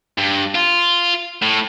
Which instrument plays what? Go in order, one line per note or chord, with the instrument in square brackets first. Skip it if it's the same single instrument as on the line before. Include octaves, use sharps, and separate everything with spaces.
[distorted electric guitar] G2
F4
A2